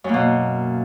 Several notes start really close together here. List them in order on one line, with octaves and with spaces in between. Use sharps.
F#2 A#3 B2